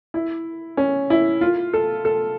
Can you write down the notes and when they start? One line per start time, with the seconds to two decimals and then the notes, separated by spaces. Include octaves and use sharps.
0.14 E4
0.77 C#4
1.10 E4
1.41 F4
1.73 A4
2.05 A4